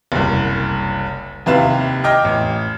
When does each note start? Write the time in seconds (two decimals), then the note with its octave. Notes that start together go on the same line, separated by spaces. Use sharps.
0.12 F#1 C2
1.46 D#2 C3 E4 B4 F5 E7
2.04 D#5 G5 D6 F6 G#6
2.24 A1